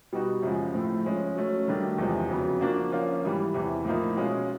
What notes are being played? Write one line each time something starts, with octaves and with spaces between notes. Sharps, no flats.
B2 G3 B3 D#4 F#4
F#2 C#3 F3 G#3
A2 F3 A3 C4
F3 G#3 C#4
F#3 A3 C#4
G2 D#3 F#3 A3 D4
E2 C3 F3 G#3
F2 C#3 F#3 B3
F3 A#3 D4 F#4
F3 A#3 C#4 F4
G#2 E3 G3
E2 C3 E3
A2 F3 A#3 D#4
B2 G#3 C#4 F4 G#4